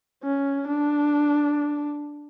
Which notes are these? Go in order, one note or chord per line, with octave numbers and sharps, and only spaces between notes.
C#4
D4